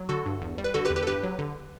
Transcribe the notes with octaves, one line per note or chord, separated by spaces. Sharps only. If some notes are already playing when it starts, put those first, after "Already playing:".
Already playing: F#3
D3 F#4 A4
G2
E2
G3
B4
D3 F#4 A4
G4 B4
E2
G4 B4
A4
G2 G4 B4
F#3
D3